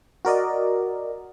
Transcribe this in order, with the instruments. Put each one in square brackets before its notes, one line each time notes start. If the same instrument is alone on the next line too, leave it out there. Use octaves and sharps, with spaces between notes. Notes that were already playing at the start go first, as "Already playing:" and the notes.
[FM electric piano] F#4 A#4 D5 D#5